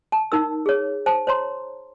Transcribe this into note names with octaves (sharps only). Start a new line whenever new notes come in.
A5
D#4 A#4 E6
G#4 C#5
C5 A5
C5 C#5 A#5 C6